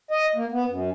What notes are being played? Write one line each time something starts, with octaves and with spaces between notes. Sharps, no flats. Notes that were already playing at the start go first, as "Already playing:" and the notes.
D#5
A#3
B3
F#2